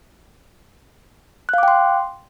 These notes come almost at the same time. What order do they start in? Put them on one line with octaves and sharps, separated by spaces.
F#6 F5 D6 G5 C6